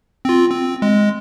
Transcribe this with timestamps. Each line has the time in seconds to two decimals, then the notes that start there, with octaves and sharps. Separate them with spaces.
0.25 C4 F4
0.51 C4
0.82 G#3